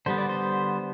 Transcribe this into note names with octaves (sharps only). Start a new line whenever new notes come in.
D3 G3 B3 C5
D5
C5